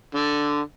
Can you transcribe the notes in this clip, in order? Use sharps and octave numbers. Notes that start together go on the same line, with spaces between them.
D3